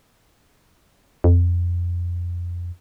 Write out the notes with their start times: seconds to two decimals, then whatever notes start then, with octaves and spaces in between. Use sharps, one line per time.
1.24 F2